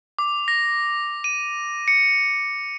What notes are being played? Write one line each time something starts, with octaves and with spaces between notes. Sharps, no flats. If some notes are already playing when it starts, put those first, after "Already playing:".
D6
A#6
D#7
C#7